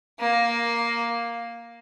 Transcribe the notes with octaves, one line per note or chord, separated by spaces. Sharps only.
A#3